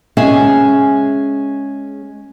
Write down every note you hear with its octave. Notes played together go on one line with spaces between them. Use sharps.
G#3 C#4 G#4 E5